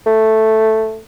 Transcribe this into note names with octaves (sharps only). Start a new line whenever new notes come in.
A3